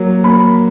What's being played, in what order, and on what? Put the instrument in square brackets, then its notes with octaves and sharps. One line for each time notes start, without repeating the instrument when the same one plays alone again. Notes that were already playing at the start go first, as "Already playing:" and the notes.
Already playing: [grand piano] F#3 A#3
A#3 B5